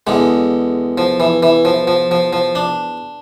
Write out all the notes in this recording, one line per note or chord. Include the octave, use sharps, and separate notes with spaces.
E2 D3 G#3
F3
E3
E3
F3
F3
F3
F3
D4